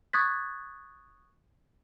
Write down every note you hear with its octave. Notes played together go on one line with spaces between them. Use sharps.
C#6 D#6 F#6 G#6 A6 B6